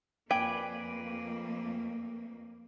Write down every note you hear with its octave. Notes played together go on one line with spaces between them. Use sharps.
F2 A#3 B4 D5 G5 G#5